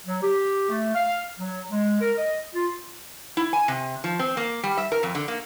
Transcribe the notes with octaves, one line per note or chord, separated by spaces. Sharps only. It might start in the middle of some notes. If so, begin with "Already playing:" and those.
F#3
G4
A3
F5
F#3
G#3
A#4
D#5
F4
E4
G#5
C3
F3
C4
A#3
G3
E5
A#4
F2
D3
A#3